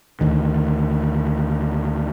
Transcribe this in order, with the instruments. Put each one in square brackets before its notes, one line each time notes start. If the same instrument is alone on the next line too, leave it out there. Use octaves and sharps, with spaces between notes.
[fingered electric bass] D2 D#3